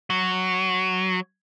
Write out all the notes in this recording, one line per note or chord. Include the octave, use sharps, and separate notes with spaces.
F#3